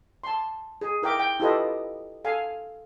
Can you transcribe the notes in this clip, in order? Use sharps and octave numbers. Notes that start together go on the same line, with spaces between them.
A5 C6
G#4
E4 A#4 E5 G5 D6
G5
E4 F4 G4 A4 B4 D#5
A4 F5 G#5